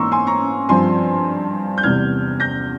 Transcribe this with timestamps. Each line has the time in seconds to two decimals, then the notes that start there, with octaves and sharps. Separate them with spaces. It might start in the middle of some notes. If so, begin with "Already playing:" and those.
Already playing: G#2 E3 A#3 C#4 A#5 C6 C#6 E6
0.12 G#5 C6
0.27 A#5 C#6
0.69 G2 F3 C4 G#5 C6
1.78 G6
1.83 E2 C3 G3 F6 G#6
2.40 G6 A#6